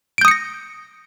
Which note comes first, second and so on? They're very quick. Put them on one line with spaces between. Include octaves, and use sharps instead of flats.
D7 G6 D#6 C#7 A#6